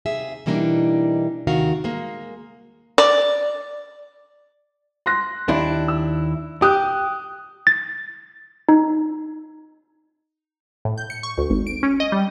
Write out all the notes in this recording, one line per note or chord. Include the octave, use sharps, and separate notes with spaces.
D#2 C3 G#4 E5
B2 E3 G3 A#3 D4 D#4
D#2 C3 D#3 F#4 F5
G#3 A#3
D5
C6 F#6 A#6
D#2 D4 E4
E6
G4 D#6 F#6
A6
D#4
A2
G6
C#7
C#6
D2
G#1
D7
C#4
D#5
G3